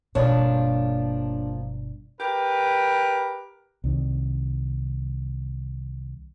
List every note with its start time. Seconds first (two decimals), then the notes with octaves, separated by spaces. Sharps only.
0.15 G1 B2 F3 A#3 D4 C#5
2.21 G4 A#4 B4
3.84 C2 D#3